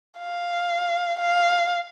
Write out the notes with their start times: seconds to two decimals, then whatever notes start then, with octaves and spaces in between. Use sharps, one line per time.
0.19 F5
1.19 F5